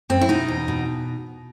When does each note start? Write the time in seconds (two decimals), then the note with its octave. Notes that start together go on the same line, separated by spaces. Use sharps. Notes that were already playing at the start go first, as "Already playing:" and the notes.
0.10 F#2 C4
0.21 E4
0.29 B2 D#4
0.48 E2
0.68 B2